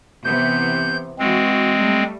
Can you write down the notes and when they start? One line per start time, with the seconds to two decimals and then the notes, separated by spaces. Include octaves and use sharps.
0.24 C3 E3 B3 G6
1.19 E3 G#3 C4 F#4
1.77 G3 A3